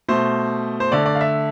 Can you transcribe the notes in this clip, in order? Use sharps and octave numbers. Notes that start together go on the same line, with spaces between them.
B2 A3 C5
C5
D3 A3 D5
D5
F5
E5